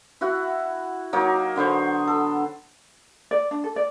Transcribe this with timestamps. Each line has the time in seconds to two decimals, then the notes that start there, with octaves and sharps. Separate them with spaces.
0.21 E4 F#4 F#5
1.13 F#3 A#3 D#4 C#5
1.56 D3 B3 C5 C#6
2.07 A4
3.31 D5
3.51 D4
3.64 A4
3.76 D5